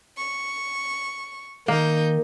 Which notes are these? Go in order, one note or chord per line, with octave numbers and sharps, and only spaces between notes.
C#6
D#3 A#3 D#4 G6